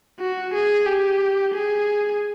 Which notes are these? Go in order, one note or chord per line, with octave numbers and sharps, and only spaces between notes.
F#4
G#4
G4
G#4